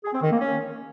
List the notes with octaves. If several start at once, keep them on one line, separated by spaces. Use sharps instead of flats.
G#4
C4
D#3
A#3
C#4